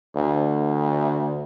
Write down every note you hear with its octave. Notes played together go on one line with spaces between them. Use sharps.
D2